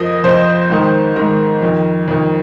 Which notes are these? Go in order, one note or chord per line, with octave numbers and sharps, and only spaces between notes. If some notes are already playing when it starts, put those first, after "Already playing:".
Already playing: F2 F3 A#4 D#5
F2 F3 C5
G#2 D#3
G#2 D#3 A#4
F2 D#3
F2 D#3